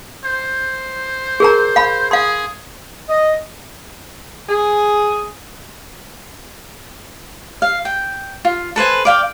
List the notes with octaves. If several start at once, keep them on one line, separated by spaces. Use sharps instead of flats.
C5
G#4 A#4 A#5
F5 B5
G#4 F5 C6
D#5
G#4
F5
G5
F4
A4 B4 C5 G#5
D5 F5 G5